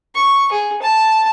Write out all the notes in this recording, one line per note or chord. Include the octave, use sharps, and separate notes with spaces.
C#6
G#4
A5